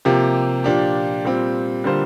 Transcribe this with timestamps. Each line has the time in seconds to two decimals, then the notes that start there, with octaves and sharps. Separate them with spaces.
0.05 C3 F3 A#3 G4
0.64 A#2 F3 D4 G4
1.24 A#2 G3 C4
1.84 D3 G3 A#3 F4 C5